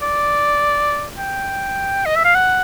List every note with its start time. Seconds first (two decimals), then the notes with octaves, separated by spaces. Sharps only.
0.02 D5
1.18 G5
2.06 D#5
2.16 E5
2.25 F5
2.35 F#5